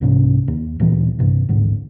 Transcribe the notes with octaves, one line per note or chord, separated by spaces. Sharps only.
C2 G#2 C3 C#4
D#2
D1 A#2 E3
B1 G2 C3
A1 D2 G#2